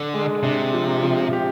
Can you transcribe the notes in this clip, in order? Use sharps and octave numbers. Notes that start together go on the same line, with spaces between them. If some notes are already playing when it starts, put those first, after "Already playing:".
Already playing: D3 D4
G#3
C3 D4
F3
F3
G4